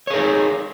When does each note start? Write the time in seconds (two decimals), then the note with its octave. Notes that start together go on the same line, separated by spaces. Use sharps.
0.07 C#5
0.10 G#4
0.13 A#4
0.16 D#4